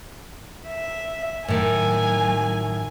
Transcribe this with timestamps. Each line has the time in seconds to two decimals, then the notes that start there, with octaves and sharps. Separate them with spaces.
0.67 E5
1.48 A2 D#3 F#3 G#5